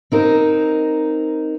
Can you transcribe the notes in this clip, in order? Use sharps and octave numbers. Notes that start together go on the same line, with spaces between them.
C4 D#4 A#4